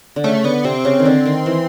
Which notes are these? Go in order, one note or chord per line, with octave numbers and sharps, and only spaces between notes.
D3
C#3 A3
D3 B3
C3 C4
C#3
D#3
D3
D#3
E3